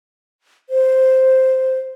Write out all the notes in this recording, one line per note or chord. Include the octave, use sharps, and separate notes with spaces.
C5